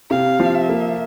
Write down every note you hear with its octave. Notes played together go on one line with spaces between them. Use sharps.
C3 F5
F3
E5
A#3